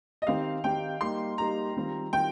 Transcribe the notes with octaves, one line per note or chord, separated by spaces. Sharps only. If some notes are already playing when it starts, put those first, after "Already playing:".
D#5
D#3 C4 D#4 G4 F5
D#3 C4 D#4 G4 G5
G3 A#3 D#4 G4 C6
G3 A#3 D#4 G4 A#5
D#3 G3 C4 F4
D#3 G3 C4 F4 G5